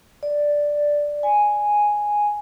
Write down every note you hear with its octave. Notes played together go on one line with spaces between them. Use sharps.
D5
G#5